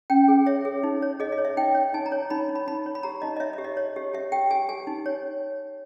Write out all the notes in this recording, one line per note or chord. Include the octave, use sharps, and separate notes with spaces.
C#4 G5
G#4
C#5 E5
G#4
D#4
C#5
G#4 D#5
D#5
C#5
E5
D#4 G5
C#5
D#4 G#5
A#5
C#5
D#4 B5
D#4
B5
D#4 B5
C#5
B5
G4 A#5
D#4 D#5
D#5
C#5 E5
D#5
G4
D#5
C#5
G4
G4 E5
G4 G5
G4 G#5
G4 G#5
D#4
C#5